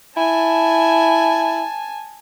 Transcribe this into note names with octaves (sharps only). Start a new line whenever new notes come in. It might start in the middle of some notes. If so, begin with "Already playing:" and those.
E4 G#5 A5